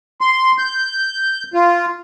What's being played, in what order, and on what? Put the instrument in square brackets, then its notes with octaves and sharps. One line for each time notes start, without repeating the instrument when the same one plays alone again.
[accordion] C6
G6
F4